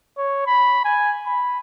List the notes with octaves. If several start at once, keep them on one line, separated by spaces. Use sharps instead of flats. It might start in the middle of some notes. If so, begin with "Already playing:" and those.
C#5
B5
G#5
B5